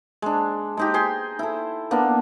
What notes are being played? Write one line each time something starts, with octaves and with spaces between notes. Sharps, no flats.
G#3 D4
G#3 D#4 G4
G#4 G5 C6
E4 A4
A#3 B3 D4